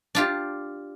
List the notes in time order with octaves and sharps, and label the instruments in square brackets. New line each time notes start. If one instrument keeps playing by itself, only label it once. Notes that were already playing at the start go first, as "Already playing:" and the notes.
[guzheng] D4 F4 G4